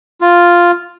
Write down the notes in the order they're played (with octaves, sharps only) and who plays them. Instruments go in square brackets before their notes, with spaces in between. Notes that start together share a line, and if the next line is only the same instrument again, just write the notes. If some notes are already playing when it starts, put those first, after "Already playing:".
[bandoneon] F4